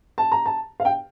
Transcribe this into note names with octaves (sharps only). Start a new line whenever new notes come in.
A5
A#5
A5
F5
G5